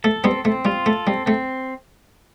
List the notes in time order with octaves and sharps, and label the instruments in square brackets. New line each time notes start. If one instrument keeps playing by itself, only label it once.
[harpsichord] A3 [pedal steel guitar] A4
[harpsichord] G3 B3 [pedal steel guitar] C4
[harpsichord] A3 [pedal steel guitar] C4
[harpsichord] G3 [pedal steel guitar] F4
[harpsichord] A3 [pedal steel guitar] A4
[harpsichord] G3 [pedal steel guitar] C4
[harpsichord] A3 [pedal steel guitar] C4